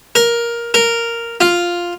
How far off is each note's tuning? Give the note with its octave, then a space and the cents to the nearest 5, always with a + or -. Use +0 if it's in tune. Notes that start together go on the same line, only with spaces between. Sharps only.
A#4 +10
A#4 -5
F4 +0